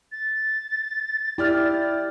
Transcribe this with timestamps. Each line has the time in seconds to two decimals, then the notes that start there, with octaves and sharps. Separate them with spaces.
0.12 A6
1.38 E4 G4 D5 F6